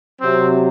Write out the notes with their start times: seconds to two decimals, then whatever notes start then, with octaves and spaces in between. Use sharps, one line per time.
0.20 C3 F#3 C4